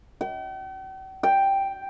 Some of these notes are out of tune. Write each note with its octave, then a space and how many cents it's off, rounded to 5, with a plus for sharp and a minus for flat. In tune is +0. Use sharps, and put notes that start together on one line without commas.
G5 -45
G5 +0